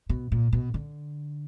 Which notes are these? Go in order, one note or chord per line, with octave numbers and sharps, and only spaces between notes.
B2
A#2
B2
D3